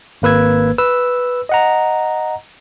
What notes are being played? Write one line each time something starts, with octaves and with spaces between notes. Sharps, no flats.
G#1 A#3 B4 E6 G#6
B4 E6
D#5 F#5 A#5